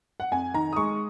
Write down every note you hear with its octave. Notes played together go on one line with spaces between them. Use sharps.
F#5
F2 G#5
D#3 A#5
D#6
G#3 C#6